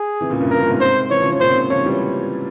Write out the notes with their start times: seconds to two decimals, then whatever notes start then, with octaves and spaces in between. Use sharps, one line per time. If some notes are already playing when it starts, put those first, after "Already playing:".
Already playing: G#4
0.21 C3 E3
0.30 A#2 C#3
0.40 G2 A#2
0.50 A#4
0.60 G2 A#2
0.70 G#2 C3
0.80 C5
1.10 C3 E3 C#5
1.20 C#3 F3
1.30 C3 E3
1.40 A#2 C#3 C5
1.50 G#2 C3
1.70 C#3 F3 C#5
1.85 E3 G3